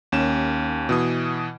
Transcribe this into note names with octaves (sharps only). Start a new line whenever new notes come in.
D#2 C#4 E7
B2 E3 D#6